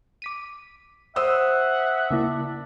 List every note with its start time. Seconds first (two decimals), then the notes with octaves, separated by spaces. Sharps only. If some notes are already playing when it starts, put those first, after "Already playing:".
0.22 D6 B6 D#7
1.16 C5 E5 F#5 D#6 E6
2.11 C#3 A#3 D4 E4